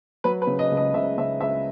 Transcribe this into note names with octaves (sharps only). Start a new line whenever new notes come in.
F#3 B4
B4
C#3
D#5
C#2
D#5
C#2 E5
C#3 E5
C#2 E5